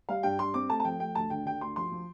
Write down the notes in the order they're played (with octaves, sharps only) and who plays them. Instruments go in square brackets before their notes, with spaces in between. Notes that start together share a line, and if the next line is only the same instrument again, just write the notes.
[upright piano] G3 F5
G2 G5
G2 C6
C4 D6
A3 A5
A5
F3 G5
A3 G5
D2 A5
D3 G5
D3 G5
D2 C6
F3 C6
F3